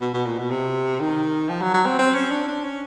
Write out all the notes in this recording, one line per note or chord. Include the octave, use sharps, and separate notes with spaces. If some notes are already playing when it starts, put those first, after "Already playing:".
B2
B2
A#2
B2
C3
D#3
F3
F#3
F#3
C4
C4
C#4
D4
D4
C#4